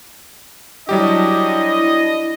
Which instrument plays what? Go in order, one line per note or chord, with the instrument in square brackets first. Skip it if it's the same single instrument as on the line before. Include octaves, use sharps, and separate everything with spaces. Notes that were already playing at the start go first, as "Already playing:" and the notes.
[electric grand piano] F#3 G3 G4 [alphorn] D4 [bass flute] E4 [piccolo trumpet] D#5